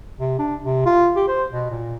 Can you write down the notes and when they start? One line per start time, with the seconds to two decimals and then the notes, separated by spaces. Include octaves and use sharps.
0.20 C3
0.39 D4
0.63 C3
0.86 F4
1.16 G4
1.28 C5
1.51 B2
1.71 A#2